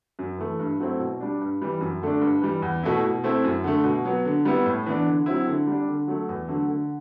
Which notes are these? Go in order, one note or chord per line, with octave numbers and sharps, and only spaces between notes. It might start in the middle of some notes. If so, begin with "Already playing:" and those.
F#2
E3 A3
G2
F#3 A3 C4 E4
B2
G3 D4
G2
E3 G3
F#2
D3 A3 D4
G2
E3 G3
E2
B2 A3 E4
B2
A3 C4 E4
F#2
D3 A3
B2
F#3 B3
D3
G3 B3 E4
A2
E3 B3 D4
D3
F#3 C4 E4
D3
G3 D4
D3
F#3 A3
E2
D3 F#3 A3
D3